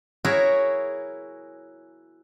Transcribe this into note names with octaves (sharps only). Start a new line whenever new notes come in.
E4 F#4 G#4 A#4 C#5